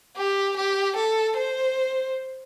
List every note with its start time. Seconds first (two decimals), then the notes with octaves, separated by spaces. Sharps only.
0.17 G4
0.57 G4
0.97 A4
1.37 C5